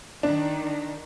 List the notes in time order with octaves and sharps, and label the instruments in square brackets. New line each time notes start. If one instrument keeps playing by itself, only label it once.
[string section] D#3 [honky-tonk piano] D4